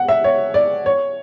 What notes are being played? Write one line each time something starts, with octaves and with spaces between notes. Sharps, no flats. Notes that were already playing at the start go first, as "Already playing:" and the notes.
Already playing: F#5
E5
C#5
D5
C#5